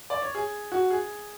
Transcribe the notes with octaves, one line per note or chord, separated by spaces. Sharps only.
D5
C#5
G#4
F#4
G#4